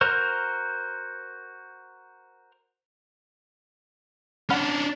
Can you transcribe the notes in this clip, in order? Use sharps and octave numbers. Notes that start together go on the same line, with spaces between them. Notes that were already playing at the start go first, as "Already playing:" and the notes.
F#4 A#4 C5 F6
C#4 D4 F#5 B5 F6